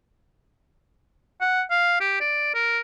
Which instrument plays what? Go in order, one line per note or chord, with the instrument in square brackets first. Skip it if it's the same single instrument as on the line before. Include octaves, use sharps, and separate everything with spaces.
[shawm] F#5
F5
G4
D5
A#4